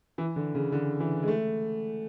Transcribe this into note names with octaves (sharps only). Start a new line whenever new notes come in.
E3
D3
C#3
D3
E3
G#3
A3